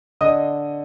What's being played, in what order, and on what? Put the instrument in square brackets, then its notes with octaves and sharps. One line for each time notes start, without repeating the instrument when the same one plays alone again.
[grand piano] D3 D#5 D#6